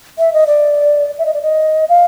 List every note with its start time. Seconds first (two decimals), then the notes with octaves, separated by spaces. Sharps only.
0.19 E5
0.33 D#5
0.47 D5
1.19 E5
1.26 D#5
1.34 D5
1.43 D#5
1.89 F5